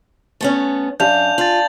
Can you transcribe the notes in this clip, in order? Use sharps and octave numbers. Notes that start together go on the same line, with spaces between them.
A3 B3 C#4
F#2 D4 F5 G#5 G6 F7
F4 A6 F#7